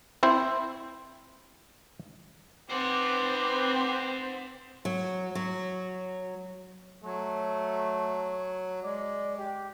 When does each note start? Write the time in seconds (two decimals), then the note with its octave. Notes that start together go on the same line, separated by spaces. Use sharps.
0.23 C4 E4 C5
2.70 C4 B4 C5 F#5 C6 D6
4.85 F#3
5.35 F#3
7.04 F#3 A3
8.84 G#3 D5
9.38 G4